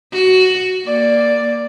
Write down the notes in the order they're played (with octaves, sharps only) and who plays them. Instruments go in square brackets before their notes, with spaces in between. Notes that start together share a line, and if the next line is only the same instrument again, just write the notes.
[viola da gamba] F#4
[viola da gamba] A#3 [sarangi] D5